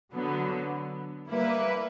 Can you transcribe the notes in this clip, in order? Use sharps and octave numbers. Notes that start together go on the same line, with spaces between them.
D3 F#3 B3
G3 A#3 E4 B4